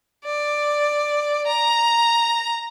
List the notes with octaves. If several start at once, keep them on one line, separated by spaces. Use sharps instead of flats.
D5
A#5